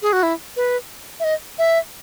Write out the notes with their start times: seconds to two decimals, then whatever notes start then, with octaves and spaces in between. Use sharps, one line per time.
0.02 G#4
0.13 F#4
0.23 E4
0.56 B4
1.20 E5
1.24 D#5
1.59 E5